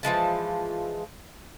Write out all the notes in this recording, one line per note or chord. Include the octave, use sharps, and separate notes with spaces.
E3 F3 G#3 A5